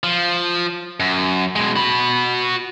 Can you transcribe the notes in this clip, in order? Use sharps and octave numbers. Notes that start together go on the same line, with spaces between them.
F3
F#2
B2 G#3
F#4 B5